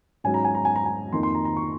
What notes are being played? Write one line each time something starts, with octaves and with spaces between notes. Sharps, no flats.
G#2 F#3 C#4 G#5
A#5
G#5
A#5
G#5
A#5
G#5
F2 D#3 A#3 D#4 C6
C6
A#5
A#5
C#6